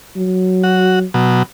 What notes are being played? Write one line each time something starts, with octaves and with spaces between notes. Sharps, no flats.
F#3
F#4
B2 F#3